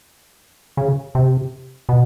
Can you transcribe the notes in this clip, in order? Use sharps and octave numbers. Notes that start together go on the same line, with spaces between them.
C#3
C3
B2